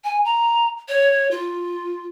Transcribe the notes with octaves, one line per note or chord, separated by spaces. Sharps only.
G#5
A#5
C#5
F4